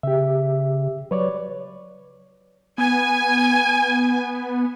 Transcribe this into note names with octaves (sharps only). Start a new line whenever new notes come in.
C#3 G4 E5
F#3 B4 C#5 D5
B3 G#5